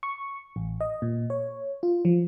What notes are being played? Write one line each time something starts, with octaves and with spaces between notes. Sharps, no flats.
C#6
A1
D#5
A#2
C#5
F4
F3